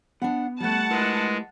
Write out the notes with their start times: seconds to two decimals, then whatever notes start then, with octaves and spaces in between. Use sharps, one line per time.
0.22 B3 D4 F#5
0.60 G3 A3 F#5 A5
0.91 G#3 E4 A#4 B4